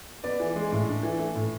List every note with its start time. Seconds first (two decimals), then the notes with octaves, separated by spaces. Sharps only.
0.24 B3 D5
0.40 E3
0.56 G#3
0.72 A2
0.88 D4
1.03 E3
1.19 A3
1.35 A2